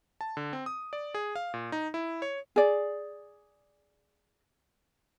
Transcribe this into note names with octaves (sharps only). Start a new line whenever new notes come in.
A5
D3
C4
D#6
D5
G#4
F5
A#2
D#4
E4
C#5
G#4 D5